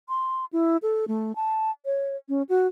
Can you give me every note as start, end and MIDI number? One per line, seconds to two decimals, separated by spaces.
0.09 0.45 84
0.53 0.77 64
0.82 1.05 69
1.08 1.35 57
1.36 1.71 81
1.86 2.16 73
2.29 2.42 61
2.49 2.67 66